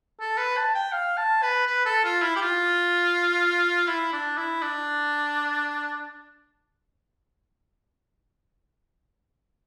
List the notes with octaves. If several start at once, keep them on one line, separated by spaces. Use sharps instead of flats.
A4
B4
A5
G5
F5
A5
B4
B4
A4
F4
E4
G4
F4
E4
D4
E4
D4